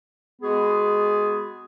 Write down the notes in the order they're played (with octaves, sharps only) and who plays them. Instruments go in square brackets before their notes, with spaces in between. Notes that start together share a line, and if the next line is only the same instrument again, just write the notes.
[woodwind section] G#3 B3 F#4 G#4